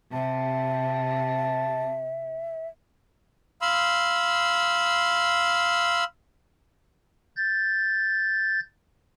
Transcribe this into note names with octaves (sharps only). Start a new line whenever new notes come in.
C3 E5 A5
F5 B5 C6 E6
G6 A6